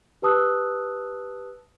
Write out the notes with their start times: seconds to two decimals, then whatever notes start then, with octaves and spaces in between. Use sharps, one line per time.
0.22 G4 B4 A5 D#6 E6 F#6